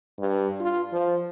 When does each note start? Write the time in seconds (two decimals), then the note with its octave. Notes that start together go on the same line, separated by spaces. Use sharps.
0.20 G2
0.60 F4
0.93 F3